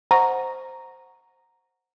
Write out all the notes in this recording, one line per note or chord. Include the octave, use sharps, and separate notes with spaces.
C5 F#5 A#5 C#6